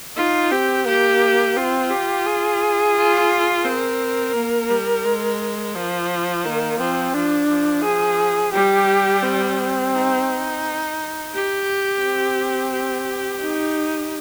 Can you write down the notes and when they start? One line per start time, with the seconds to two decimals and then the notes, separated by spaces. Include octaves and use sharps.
0.16 D#4 F4
0.51 C4 G4
0.86 A#3 G4
1.56 C4 F4
1.90 G4
2.27 G#4
2.96 F4
3.65 C4 A#4
4.35 A#3
4.70 G3
5.05 G#3
5.75 F3
6.45 D#3 A#3
6.79 F3 C4
7.14 F3 D4
7.49 F3
7.84 G#4
8.53 G3 G4
9.23 C4
9.94 D#4
11.33 G4
12.03 C4
12.72 G4
13.42 D#4